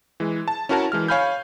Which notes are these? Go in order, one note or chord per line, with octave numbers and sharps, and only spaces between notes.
E3 G#3
A5
C#4 E4 F#4 A#4 F#5 A5
E3 G#3 F6
C#5 F5 G#5 B5 F6 G6